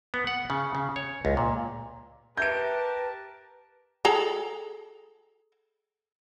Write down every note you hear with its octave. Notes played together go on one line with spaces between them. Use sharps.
B3
F#5
C#3
C#3
C#5
C#2
A#2
G4 A#4 B4 E5 A5 G6 G#6 D7
G#4 A4 A#5